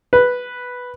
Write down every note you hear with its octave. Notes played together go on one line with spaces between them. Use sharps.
B4